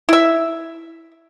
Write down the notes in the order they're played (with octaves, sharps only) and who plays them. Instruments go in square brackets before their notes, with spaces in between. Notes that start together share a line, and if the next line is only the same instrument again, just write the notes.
[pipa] E4 E5